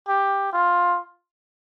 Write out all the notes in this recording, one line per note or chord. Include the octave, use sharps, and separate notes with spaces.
G4
F4